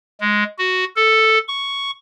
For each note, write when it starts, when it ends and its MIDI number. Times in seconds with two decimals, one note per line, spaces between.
0.21 0.44 56
0.59 0.85 66
0.96 1.38 69
1.48 1.91 85